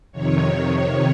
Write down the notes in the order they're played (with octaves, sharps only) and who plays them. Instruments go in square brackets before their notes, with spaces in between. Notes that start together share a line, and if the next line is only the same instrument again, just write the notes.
[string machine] F2 C3 D#3 C#5